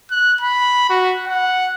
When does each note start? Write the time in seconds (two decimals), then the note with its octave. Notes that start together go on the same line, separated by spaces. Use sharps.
0.11 F#6
0.41 B5
0.90 F#4
1.27 F#5